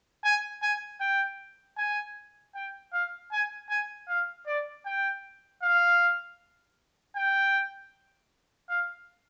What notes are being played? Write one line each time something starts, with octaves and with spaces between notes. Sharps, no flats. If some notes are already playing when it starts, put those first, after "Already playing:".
G#5
G#5
G5
G#5
G5
F5
G#5
G#5
F5
D5
G5
F5
G5
F5